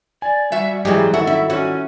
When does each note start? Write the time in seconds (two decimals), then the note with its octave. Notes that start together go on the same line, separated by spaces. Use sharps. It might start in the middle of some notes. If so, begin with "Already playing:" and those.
0.22 D5 G#5
0.52 G3 F#4 E5
0.85 F#2 E3 F#3 G#3 G4 G#4
1.14 D#3 E4 F#4 A4
1.27 E4 E5
1.50 C#4 F#4 C#5